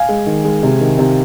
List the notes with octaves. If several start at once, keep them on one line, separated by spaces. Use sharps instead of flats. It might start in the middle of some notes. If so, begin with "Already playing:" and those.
Already playing: F5 G#5
G#3
D#3
G#3
C3
D#3
C3